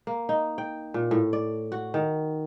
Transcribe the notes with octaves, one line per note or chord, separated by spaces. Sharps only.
A#3
D#4
G5
A#2
A2
D5
F#4
D#3